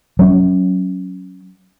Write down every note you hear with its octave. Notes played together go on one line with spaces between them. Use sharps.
F#3 C#4